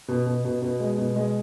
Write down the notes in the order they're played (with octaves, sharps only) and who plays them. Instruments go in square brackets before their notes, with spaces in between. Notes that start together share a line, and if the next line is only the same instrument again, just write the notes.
[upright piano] B2
B2
B2
B2
G#3
B2
G#3